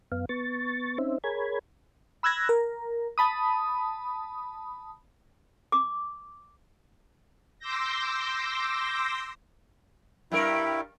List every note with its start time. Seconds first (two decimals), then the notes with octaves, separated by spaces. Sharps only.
0.12 F#2 B3 F5
0.29 B3 C#6 A6
0.98 C4 C#4 D#4 C5 E5
1.24 G#4 A#4 C#5 B5 G#6
2.23 B5 E6 F#6 G#6 A#6
2.49 A#4
3.18 A5 B5 D#6
5.72 D6
7.59 C6 D6 E6 G6 A#6
10.32 G2 G3 E4 A#4